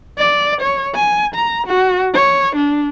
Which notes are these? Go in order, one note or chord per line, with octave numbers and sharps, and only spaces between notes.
D5
C#5
G#5
A#5
F#4
C#5
D4